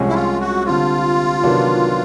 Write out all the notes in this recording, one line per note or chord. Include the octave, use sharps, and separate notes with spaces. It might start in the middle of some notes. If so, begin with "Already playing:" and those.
Already playing: C2 C3 F3 G#3 C#4
E4
F4
F#4
D3 G3 C4 F4
C3 D#3 F#3 B3 D4